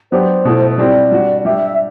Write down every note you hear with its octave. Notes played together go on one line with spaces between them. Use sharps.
F#3 B3 D4 G4 C5
B2 A3 E4
G3 C4 E4 G4 D5
G3 D4 F#4
G3 D4 G4 E5